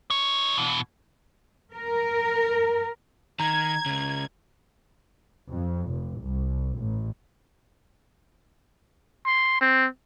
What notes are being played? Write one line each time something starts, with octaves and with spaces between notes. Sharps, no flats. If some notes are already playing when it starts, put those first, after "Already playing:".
D#4 C#5
B2 E3
A#4
D#3 A#5 G#6
C#2 C#3
F2
F1
C2
A1
C6
C4